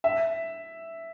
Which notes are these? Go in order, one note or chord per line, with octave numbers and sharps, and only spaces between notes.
E5